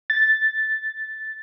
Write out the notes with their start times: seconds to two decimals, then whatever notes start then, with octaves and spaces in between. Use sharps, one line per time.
0.10 A6